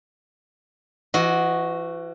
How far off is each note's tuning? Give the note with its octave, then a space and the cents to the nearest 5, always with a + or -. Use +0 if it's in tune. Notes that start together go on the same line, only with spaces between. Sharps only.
E3 +40 F#4 +0 D#5 +10